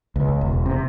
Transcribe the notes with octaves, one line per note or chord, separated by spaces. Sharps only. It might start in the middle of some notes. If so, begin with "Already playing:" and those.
C#2
E1
C3